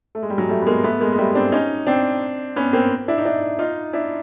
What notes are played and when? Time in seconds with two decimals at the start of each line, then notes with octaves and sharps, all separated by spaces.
0.15 A3
0.23 G#3
0.30 G3
0.38 F#3 G#3
0.49 G3 A3
0.62 B3
0.67 G#3 A#3
0.83 A3 B3
1.00 G#3 A#3
1.13 G#3
1.18 G3 A3
1.35 C4 D4
1.52 C#4 D#4
1.87 C4 D4
2.56 B3 C#4
2.73 A#3 C4
3.08 D4 E4
3.18 D#4
3.25 D4 E4
3.59 D#4 F4
3.93 D4 E4